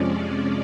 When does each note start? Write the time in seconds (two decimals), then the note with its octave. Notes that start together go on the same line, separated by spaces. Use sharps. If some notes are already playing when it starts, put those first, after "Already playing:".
Already playing: F2 C3 F3 G#3 C#4 D5